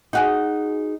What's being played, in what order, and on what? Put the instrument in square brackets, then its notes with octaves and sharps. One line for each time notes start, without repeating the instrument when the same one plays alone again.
[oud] D#4 F#4 G#4